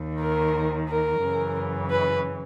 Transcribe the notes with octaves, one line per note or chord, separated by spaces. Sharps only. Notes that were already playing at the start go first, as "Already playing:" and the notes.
Already playing: D#2 D#3
A#4
A#4
F#2 C#3 E3
B4